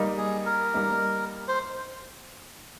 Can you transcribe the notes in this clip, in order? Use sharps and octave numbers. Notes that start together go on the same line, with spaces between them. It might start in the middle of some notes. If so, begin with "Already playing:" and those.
Already playing: G3 A#3 D#4
G#4
A#4
G3 A#3 D#4
C5